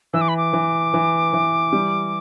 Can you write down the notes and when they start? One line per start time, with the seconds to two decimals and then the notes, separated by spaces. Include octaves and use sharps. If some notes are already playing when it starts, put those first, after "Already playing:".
0.13 E3 E6
0.21 D6
0.29 B5
0.37 D6
0.53 E3
0.94 E3
1.33 E3
1.73 G3